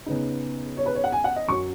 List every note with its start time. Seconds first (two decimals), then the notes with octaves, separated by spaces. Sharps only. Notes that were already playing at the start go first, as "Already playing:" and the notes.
0.06 C#3 B3 D#4
0.77 C#5
0.86 B4
0.95 C#5
1.04 F#5
1.12 G#5
1.24 F#5
1.36 D#5
1.48 F#2 F#3 C#4 C#6